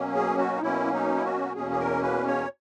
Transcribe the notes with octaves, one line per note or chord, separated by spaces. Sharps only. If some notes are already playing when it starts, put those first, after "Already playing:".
Already playing: B2 F#3 A#3 C#4
G#4
F#4
D#4
B2 F#3 A#3 C#4 E4
D#4
E4
F#4
E2 B2 A#3 C#4 G#4
G#4
A#4
B4
C#5